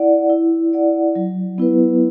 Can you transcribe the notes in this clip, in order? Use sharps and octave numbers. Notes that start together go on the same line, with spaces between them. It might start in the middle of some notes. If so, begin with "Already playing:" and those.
Already playing: E4 D5 F#5
E4
D5 F#5
F#3
B3 E4 B4